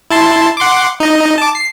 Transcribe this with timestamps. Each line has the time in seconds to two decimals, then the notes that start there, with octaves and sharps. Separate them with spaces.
0.11 E4 A5 C6
0.57 F#5 C6 D6
1.00 D#4 D#5
1.38 A5 D6
1.55 C7